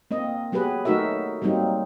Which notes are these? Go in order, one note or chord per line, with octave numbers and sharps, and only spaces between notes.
A#3 C4 D#5
F#3 B3 G4 G#4 B4
F#3 A3 D#4 F#4 A#4 E5
F#3 G3 A#3 C4 D#4